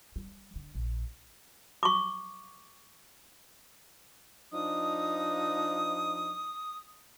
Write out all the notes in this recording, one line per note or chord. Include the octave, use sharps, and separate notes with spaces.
G3
D3
A#1
C#6 D6
F3 D4 D#4 D#6